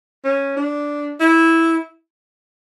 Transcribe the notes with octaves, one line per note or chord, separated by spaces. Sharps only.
C#4
D4
E4